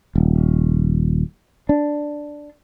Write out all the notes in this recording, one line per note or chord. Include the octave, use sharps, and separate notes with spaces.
D#1
D4